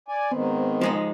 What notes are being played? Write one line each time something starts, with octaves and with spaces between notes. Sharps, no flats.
D5 G#5
G#2 D#3 B3 C4
F3 G#3 D#4